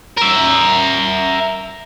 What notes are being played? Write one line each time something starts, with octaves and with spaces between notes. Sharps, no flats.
A#4 E5